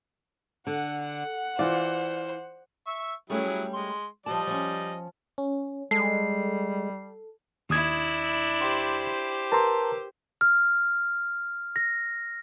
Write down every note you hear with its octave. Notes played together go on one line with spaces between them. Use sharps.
D3 F#5
F#5
E3 F4 C5 D5
E5 C#6 E6
F#3 G3 A3 C#4 E4 G#4
G#3 C6
F3 G3 D#5 A5
F3 C#4
C#4
G3 G#3 A4 C7
D#2 D4 E4 D#6 G#6
G4 C5 C6
A#4 B4 A5 A#5 C6 E6
F6
A#6